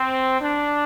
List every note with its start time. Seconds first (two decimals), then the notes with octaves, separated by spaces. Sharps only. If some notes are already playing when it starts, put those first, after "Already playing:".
Already playing: C4
0.41 D4